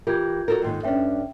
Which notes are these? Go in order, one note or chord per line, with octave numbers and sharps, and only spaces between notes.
E3 F4 G4 A#4 G6 G#6
F#4 A4 A#4
D#2 G#2 D#3
G2 C#4 D4 E5 G5